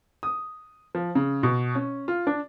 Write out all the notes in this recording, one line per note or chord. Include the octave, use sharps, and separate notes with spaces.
D#6
F3
C#3
B2
C#4
F4
D4